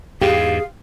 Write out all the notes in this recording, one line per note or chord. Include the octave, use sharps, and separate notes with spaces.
E2 G#2 G4 G#4 F5